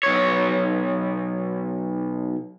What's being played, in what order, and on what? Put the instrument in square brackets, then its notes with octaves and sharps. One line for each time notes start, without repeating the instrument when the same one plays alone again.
[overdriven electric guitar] B1 C#5